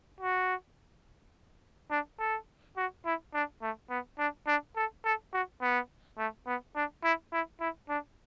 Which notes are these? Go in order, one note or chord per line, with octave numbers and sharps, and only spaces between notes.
F#4
D4
A4
F#4
E4
D4
A3
B3
D4
D4
A4
A4
F#4
B3
A3
B3
D4
E4
E4
E4
D4